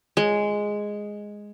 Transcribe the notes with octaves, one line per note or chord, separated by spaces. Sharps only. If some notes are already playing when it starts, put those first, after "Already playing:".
G#3